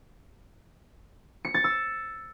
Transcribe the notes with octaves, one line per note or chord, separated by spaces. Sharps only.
C#7
A6
E6